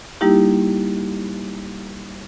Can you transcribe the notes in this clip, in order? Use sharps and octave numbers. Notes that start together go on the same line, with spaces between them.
G3 A#3 D#4 E4 G4